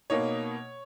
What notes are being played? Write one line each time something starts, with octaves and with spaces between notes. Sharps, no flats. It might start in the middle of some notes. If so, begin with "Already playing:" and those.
B2 A#3 D#4 C#5